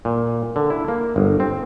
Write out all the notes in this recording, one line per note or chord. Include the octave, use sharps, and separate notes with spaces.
A#2
D3
E4
A#3
G1
C4